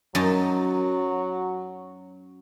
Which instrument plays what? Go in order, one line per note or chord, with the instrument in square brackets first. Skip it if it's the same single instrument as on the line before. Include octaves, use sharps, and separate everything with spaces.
[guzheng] F#2 D#4 A5 [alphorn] F#3